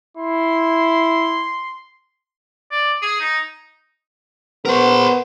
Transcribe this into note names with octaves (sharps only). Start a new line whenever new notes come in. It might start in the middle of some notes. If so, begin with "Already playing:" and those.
E4 C6
D5
G#4
D#4
B3 A#4 C5